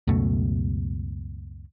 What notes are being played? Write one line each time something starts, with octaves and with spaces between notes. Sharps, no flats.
C#2 F#2 B2 A3